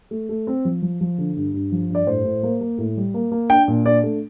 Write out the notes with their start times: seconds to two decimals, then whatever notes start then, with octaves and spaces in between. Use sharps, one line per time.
0.11 A3
0.29 A3
0.47 C4
0.65 F3
0.82 F3
1.01 F3
1.18 D3
1.37 G2
1.54 G2
1.72 F3
1.90 G2 D5
2.07 A2 C5
2.25 A2
2.43 A#3
2.61 A#3
2.78 A2
2.97 G3
3.14 A#3
3.32 A#3
3.50 D4 G5
3.68 A#2
3.86 D4 D5
4.03 A3